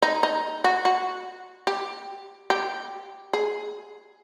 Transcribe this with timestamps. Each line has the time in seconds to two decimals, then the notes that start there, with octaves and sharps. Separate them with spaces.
0.02 D#4
0.23 D#4
0.64 F#4
0.85 F#4
1.67 G4
2.50 G4
3.33 G#4